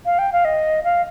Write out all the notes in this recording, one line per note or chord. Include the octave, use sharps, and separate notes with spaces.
F5
G5
F5
D#5
F5